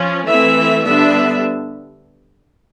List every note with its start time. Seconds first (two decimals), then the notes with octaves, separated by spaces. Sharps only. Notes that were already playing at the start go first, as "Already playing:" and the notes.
Already playing: F3 C#4
0.27 E3 A3 C4 E5
0.84 D3 G3 B3 D4 E5